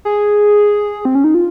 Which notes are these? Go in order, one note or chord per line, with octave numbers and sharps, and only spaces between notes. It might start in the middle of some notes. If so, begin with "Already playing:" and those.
G#4
C4
C#4
D#4
F4